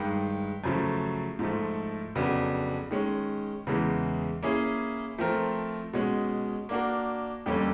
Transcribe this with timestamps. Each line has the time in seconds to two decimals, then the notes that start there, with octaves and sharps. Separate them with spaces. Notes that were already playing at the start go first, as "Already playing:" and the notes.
Already playing: G2 D#3 G#3
0.64 F#2 C#3 F3 A3
1.39 G#2 F3 A3
2.15 F2 C#3 F#3 B3 D4
2.91 D#3 G#3 C#4
3.67 E2 C#3 E3 G#3
4.43 A#3 C#4 E4 G#4
5.18 F3 A3 C4 F4 A#4
5.93 B2 G#3 C#4
6.69 A#3 D4 F#4 A#4
7.46 F2 D3 G3 A#3 C#4